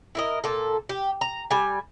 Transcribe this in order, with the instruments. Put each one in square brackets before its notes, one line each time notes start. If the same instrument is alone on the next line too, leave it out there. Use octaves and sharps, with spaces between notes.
[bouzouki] E4 A#4 D#5
A#2 A4
G4
A#5
G3 G#5